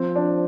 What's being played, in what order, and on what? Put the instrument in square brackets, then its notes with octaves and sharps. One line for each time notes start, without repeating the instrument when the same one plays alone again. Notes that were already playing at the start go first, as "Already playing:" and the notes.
Already playing: [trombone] F3 [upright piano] C4
[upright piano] D4